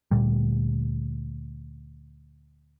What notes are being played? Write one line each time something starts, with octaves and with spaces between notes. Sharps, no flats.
D2 A#2 G3